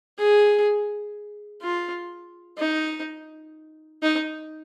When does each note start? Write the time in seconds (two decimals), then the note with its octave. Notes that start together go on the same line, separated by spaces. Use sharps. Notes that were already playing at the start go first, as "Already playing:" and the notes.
0.18 G#4
1.62 F4
2.58 D#4
4.03 D#4